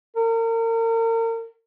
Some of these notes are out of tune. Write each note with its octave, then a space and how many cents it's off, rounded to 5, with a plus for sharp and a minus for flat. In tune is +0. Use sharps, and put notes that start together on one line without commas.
A#4 -35